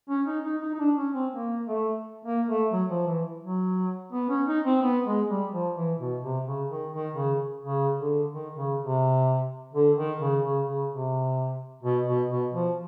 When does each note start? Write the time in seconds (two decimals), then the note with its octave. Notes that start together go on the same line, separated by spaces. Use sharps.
0.09 C#4
0.27 D#4
0.44 D#4
0.61 D#4
0.74 D#4
0.79 D4
0.97 C#4
1.14 C4
1.32 A#3
1.67 A3
2.25 A#3
2.49 A3
2.72 F#3
2.90 F3
3.07 E3
3.42 F#3
4.12 B3
4.29 C#4
4.47 D#4
4.65 C4
4.82 B3
5.06 G#3
5.29 G3
5.52 F3
5.76 E3
5.99 B2
6.23 C3
6.46 C#3
6.69 D#3
6.93 D#3
7.15 C#3
7.63 C#3
7.98 D3
8.32 D#3
8.56 C#3
8.79 C3
9.73 D3
9.97 D#3
10.20 C#3
10.43 C#3
10.67 C#3
10.90 C3
11.83 B2
12.07 B2
12.30 B2
12.53 F3